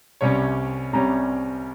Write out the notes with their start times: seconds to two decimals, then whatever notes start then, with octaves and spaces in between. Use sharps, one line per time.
0.21 C2 C3 G3 C#4 C#5
0.93 C2 C3 G3 C#4 A#5